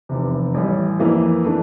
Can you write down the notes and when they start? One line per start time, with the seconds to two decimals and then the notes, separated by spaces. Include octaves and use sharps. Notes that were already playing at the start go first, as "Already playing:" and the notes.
0.09 F1 E2 C3
0.54 A1 A2 G3
0.99 F2 E3 A#3 E4
1.45 E3 A3 D4